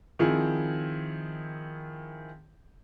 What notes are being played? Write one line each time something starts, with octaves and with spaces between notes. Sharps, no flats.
D#3 F3 C4 E4 G#4